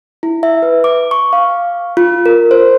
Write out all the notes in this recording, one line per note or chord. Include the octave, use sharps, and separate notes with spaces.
E4
E5
B4
D6
C#6
F5
F4
A#4
C5